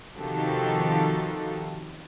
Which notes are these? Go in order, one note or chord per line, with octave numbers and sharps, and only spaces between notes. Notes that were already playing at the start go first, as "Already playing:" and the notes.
C3 D#3 F3 F#4 G4 A4